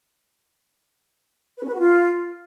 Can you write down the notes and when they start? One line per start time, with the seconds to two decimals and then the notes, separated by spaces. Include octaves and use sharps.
1.58 B4
1.63 C#4
1.68 B4
1.73 F#4
1.78 F4